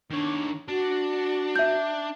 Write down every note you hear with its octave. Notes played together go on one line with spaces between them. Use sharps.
D#3 D4 C#5
D4 F#4
E5 G6